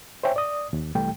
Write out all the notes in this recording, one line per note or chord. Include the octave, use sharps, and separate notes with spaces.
C5 C#5 E5 G5 G#5
D5 D#6
D#2
C2 E3 G3 A3 G5